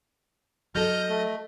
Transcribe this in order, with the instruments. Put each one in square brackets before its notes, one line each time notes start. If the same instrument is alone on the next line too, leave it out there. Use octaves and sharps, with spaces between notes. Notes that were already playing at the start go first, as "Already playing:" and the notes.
[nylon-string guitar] F#3 A4 [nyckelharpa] D#5 [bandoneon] F6 G6
[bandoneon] A3